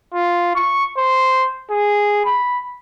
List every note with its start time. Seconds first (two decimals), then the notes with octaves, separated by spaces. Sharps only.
0.14 F4
0.56 C#6
0.98 C5
1.71 G#4
2.25 B5